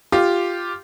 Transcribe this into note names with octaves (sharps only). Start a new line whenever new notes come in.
F4 G4